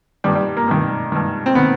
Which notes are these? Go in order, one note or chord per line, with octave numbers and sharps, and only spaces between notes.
G2 D#3 G3
G3
A#3
G2 D#3
G2 D#3
C4
D#3 B3